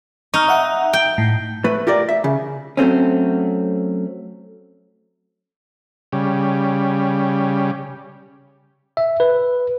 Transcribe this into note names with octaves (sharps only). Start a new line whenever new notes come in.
D#4 C#6 F6
E5 F#5
G5
A2
A3 B4
F4 G4 A#4 D5
E5
C#3
F#3 A3 C4 C#4
C#3 G3
E5
B4